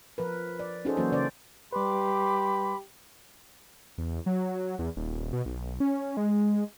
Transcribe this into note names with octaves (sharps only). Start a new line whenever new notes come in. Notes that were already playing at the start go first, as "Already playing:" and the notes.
F3 A#4 B4
D5
C#4 D#4 F#4 G#4 A4 C5
E3 F#3 A#3 C#4 F#4 C5
C#3 C#4 C5 D5
G3 G4 B4 B5 C6 D6
E2
F#3
E2
D#1
B2
B1
C#4
G#3